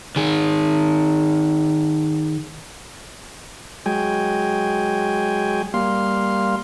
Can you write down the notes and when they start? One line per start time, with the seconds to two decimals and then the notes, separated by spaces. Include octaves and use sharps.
0.16 D#3 G#4
3.86 F#3 G#3 G5 G#5
5.74 G3 A#3 F5 C6